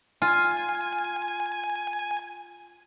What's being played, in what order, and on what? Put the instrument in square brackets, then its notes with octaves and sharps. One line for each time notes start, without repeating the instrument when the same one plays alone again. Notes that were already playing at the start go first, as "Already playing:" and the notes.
[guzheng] F4 [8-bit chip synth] G#5